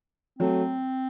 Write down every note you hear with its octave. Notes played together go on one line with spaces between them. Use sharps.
F#3 A3 C4